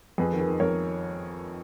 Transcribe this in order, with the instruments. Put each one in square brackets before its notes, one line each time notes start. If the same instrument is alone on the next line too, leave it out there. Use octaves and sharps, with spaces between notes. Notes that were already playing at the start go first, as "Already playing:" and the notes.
[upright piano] F2 G#4 B4
D#3
G#4 B4
D#3
F2 A#4 C#5